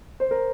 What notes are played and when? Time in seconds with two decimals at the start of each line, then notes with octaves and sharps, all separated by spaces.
0.20 C5
0.31 A#4